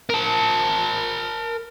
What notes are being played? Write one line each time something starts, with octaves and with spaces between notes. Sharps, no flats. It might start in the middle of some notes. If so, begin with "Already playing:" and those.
A#4 A5